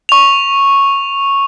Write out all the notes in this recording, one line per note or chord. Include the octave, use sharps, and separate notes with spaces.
C#6 F7